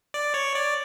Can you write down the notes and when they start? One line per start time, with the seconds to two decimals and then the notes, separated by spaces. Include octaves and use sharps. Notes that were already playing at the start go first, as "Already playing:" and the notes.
0.14 D5
0.34 C#5
0.55 D5